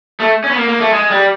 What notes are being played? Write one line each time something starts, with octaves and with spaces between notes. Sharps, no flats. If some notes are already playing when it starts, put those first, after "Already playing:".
A3
C#4
B3
A#3
A#3
A3
G#3
G3